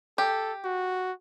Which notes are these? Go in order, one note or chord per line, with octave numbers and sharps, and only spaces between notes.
G4 A4
F#4